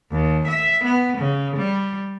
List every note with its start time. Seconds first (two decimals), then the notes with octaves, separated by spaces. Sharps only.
0.12 D#2
0.48 E5
0.85 B3
1.18 C#3
1.57 G3